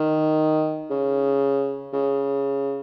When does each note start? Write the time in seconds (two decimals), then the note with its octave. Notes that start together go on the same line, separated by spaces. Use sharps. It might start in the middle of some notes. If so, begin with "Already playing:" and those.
Already playing: D#3
0.90 C#3
1.93 C#3